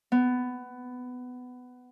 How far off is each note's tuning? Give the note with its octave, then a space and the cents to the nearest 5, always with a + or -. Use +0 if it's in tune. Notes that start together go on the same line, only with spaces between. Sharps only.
B3 +15